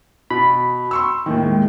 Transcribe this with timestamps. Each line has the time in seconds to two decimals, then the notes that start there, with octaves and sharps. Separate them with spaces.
0.30 B2 B5
0.91 C6 C#6 E6
1.26 D#2 A2 D#3
1.46 G#3